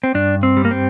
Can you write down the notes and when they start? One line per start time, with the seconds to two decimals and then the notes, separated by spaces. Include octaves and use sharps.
0.04 C4
0.14 G2 D4
0.43 C4
0.57 G3
0.65 A#3
0.71 C4